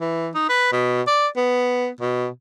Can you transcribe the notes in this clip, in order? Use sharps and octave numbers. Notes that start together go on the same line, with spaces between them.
E3
D#4
B4
B2
D5
B3
B2